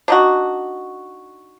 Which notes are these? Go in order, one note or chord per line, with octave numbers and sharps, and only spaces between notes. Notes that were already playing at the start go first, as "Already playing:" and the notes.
D4 D#4 F#4